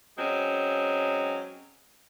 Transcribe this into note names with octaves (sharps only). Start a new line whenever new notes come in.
F#3 G#3 C4 C#4